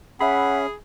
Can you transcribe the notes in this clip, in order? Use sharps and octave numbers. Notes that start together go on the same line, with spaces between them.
C#4 G#4 E5 F#5 B5